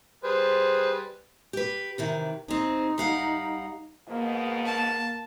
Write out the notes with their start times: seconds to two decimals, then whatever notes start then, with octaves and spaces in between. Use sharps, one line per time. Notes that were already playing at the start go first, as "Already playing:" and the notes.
0.24 G3 G#4 B4 C5
1.53 G4 B4
1.98 C3 D#3 E3
2.48 C4 D#4 G#4
2.98 G3 F5 F#5
4.08 G#2 B2 A#3
4.66 A5